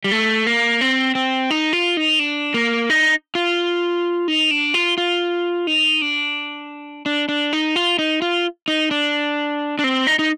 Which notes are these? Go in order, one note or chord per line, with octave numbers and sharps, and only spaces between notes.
G3
A3
A#3
C4
C4
D#4
F4
D#4
D4
A#3
D#4
F4
D#4
D4
F4
F4
D#4
D4
D4
D4
D#4
F4
D#4
F4
D#4
D4
D4
C4
D#4
D#4